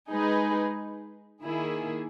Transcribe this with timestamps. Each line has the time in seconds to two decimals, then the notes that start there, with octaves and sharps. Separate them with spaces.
0.10 G#3 D#4 G#4 B4
1.43 D#3 A#3 E4 G#4